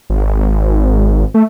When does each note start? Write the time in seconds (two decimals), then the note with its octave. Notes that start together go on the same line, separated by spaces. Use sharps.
0.10 G#1
1.34 A3